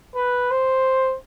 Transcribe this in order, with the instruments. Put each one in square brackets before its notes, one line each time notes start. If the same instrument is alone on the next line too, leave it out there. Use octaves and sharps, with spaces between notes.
[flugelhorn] B4
C5